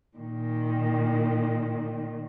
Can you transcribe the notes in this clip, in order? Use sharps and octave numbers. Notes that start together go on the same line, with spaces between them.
A#2 D#3